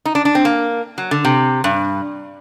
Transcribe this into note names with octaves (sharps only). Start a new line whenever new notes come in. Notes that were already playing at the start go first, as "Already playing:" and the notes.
D#4
D4
D4
C4
A#3
F#3
D3
C3
G2